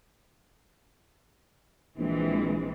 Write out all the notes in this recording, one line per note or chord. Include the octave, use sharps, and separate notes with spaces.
A#1 E3 G#3 C4